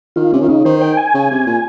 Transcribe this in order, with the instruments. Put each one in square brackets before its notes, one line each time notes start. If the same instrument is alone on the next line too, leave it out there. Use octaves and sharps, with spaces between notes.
[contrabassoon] D#3 [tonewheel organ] F4
[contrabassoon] C3 [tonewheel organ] C#4
[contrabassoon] D#3
[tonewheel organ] F4
[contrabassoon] C#3 [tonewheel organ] D#4
[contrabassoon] D#3 [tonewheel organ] C5
[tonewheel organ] G5
G#5
[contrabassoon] C#3
C3
A#2